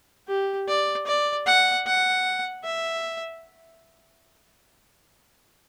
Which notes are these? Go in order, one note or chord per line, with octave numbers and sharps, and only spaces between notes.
G4
D5
D5
F#5
F#5
E5